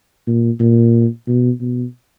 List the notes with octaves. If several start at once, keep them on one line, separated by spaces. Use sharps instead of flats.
A#2
A#2
B2
B2